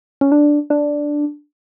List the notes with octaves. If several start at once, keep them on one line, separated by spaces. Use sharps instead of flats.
C#4
D4
D4